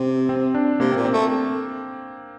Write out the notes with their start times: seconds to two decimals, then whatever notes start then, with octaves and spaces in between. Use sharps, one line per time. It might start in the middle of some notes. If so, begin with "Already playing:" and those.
Already playing: C3 C4
0.29 C4
0.55 D4
0.80 C3 A#3
0.92 C4
0.96 A#2
1.05 C4
1.13 A3